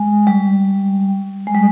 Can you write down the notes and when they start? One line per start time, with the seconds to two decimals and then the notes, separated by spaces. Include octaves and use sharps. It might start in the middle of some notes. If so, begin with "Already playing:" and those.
Already playing: G#3
0.27 G3
1.47 G#3
1.55 G3